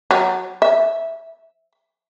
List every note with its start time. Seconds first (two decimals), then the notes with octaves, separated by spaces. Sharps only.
0.11 F#3
0.62 E5